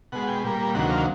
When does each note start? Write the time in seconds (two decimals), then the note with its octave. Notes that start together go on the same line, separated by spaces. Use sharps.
0.12 B2 G#3 F#5
0.27 G5
0.44 A#2 G3 A#3
0.74 D2 C3 D#3 F#3 A#3 F#5
0.90 F5